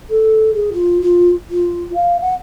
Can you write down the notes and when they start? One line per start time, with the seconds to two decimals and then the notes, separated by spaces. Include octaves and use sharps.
0.10 A4
0.54 G#4
0.72 F4
1.01 F4
1.50 F4
1.94 F5
2.21 F#5